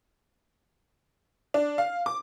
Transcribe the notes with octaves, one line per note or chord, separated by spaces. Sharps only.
D4
F5
D6